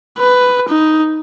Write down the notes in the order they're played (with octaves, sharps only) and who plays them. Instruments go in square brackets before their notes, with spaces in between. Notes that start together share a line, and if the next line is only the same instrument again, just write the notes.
[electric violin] B4
D#4